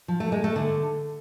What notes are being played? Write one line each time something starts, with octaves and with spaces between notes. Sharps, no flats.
F3
A3
G#3
A3
D3